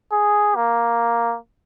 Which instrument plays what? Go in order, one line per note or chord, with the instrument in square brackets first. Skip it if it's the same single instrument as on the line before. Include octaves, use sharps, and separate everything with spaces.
[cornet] G#4
A#3